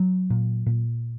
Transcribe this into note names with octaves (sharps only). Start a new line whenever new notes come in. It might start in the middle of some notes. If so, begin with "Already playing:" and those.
Already playing: F#3
A#2
A#2